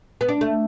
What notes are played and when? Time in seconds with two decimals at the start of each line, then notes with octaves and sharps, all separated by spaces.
0.21 B3
0.29 D4
0.41 A3